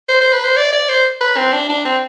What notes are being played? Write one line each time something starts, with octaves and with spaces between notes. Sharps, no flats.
C5
C5
B4
C5
D5
D5
C5
B4
C4
D4
D4
C4